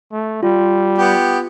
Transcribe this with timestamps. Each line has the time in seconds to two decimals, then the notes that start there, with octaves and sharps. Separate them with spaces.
0.12 A3
0.43 G3 F4
0.98 B3 G4